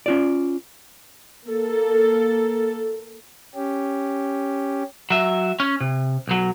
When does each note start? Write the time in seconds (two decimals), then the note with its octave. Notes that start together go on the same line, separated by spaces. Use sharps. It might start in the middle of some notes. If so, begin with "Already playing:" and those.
0.06 C#4 F4 D5
1.48 A#3 A4
3.55 C#4 G4
5.10 F#3 E5
5.60 C#4
5.81 C3
6.28 B1 F#3